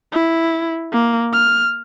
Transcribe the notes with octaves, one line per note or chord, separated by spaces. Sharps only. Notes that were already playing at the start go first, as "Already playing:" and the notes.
E4
A#3
F6